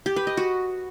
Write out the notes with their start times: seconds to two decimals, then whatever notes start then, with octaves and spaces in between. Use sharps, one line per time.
0.06 G4
0.16 B4
0.27 D#5
0.37 F#4